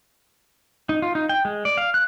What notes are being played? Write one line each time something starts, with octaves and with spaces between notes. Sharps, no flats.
D#4
F4
D#4
G5
G#3
D5
F5
F#6